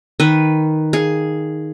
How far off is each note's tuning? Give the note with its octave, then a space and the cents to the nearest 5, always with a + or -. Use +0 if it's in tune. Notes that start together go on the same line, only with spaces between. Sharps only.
D#3 +0 B4 +0
G#4 +0 F5 +0